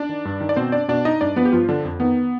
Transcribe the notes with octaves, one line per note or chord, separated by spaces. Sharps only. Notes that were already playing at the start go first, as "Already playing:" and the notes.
Already playing: D4 D5
D#3
G2
D#3
D5
B2 C4 C5
D4 D5
B2 D4 D5
D#4 D#5
G2 D4 D5
F3 B3 B4
G4
G2 F3 F4
D3 F3 D4
F2
D#3 B3